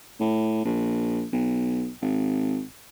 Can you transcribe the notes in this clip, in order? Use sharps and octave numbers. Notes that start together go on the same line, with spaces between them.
A2
A#1
B1
G#1